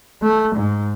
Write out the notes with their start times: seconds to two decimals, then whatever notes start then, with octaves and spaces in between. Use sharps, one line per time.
0.23 A3
0.56 G#2